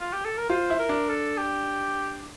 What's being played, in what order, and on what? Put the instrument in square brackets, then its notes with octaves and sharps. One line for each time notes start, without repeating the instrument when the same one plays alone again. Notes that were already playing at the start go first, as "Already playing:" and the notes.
[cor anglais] F4
G4
A4
A#4
[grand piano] F4 [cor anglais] C5
[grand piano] E4
[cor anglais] A#4
[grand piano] D4
[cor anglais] A4
G4